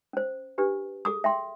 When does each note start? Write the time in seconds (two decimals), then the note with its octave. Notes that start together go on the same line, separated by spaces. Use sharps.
0.13 C#4 C5
0.58 D4 G4 B4
1.05 G#4 A4 D6 D#6
1.24 E5 G5 C6